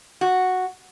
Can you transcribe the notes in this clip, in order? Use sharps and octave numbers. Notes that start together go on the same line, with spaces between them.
F#4